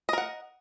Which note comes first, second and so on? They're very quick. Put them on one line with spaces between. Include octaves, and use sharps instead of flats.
D#5 A#4 F#5